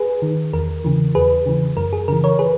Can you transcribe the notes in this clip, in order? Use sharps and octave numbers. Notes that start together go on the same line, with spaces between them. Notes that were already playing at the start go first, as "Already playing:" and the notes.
Already playing: G#4 B4
D#3
E2 A#4
C#3 E3
E2 G#4 B4
C#3 E3
F#2 A#4
G#4
C#3 E3 A#4
A#4 C#5
G#4 B4